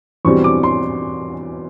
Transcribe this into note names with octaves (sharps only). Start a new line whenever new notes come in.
E2 B2 G3 C4 C#6
D6
C6